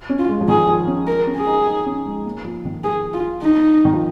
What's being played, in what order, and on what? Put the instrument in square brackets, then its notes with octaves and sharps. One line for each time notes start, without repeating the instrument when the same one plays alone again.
[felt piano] C#4
[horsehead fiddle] F4
[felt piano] G#3
F3
[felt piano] D#3 [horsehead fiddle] G#4
[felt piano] F3
C#4
[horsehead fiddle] A#4
[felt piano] C#4
[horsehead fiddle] G#4
[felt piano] D#4
D#4
C#4
G#3
A#3
F3
D#3
[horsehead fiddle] G#4
F4
D#4
[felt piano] D#3
F3